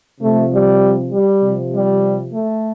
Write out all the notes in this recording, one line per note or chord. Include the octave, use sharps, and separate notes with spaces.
C3 F3 A3
G3
G3
C3 F3
G3
A3